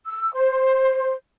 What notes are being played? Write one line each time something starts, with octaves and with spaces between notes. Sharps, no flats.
E6
C5